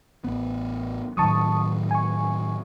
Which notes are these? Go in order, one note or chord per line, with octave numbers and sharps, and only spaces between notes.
A1 B3
A2 D#3 F#3 A5 C#6 D#6
G#5 C#6